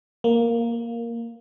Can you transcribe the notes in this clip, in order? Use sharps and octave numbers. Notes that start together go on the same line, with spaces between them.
A#3